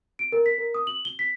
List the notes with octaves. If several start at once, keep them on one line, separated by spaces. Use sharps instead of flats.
D7
A#4
B6
A#4
D#6
F#7
G7
B6